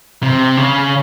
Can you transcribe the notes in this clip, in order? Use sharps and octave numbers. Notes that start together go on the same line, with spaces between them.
C3
C#3